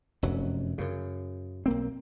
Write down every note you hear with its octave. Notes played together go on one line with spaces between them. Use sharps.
F1 F#2 F#3
F#2 C#3
B1 A#3 C4